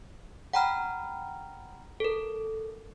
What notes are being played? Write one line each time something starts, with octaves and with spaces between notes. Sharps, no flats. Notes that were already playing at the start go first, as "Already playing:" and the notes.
F#5 G5 A#5 B5 F6
A4 A#4